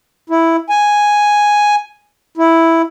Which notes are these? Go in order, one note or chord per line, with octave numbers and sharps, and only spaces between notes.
E4
G#5
E4